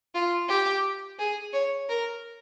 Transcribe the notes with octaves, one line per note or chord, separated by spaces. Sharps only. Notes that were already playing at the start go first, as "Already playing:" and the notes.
F4
G4
G#4
C#5
A#4